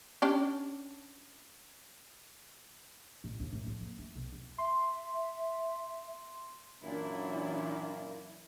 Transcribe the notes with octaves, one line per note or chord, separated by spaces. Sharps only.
C#4 D4 G4
A1
D#2
A2
F2
A#3
A3
B1
E2
E5 C6
F#2 A#2 E3 D4 E4